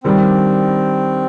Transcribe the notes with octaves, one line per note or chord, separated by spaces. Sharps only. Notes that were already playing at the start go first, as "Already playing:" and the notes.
D#3 G3 C4 D4